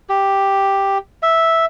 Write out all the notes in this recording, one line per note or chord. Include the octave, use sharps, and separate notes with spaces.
G4
E5